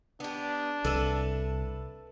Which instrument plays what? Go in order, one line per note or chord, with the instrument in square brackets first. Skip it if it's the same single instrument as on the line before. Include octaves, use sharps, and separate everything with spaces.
[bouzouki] B3 G4 [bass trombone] D4
[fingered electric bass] C2 [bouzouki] A4 B4 E5